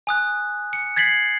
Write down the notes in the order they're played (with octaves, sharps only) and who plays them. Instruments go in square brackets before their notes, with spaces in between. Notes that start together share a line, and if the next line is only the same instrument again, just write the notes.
[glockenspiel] G#5 D#6 F#6
C#7
G#6 A6 B6 C7 F#7